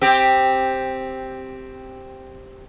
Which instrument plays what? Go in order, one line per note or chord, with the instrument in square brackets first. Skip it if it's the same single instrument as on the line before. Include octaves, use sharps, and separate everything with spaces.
[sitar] C4 G4